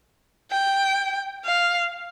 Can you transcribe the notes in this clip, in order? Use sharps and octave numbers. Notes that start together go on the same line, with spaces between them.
G5
F5